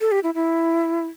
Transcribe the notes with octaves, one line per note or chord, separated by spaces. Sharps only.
A4
G4
E4
E4